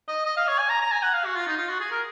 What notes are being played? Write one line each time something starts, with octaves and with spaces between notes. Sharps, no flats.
D#5
D#5
F5
C#5
G#5
A#5
A#5
G#5
F#5
F5
F#4
F4
D#4
F4
F#4
G#4
A#4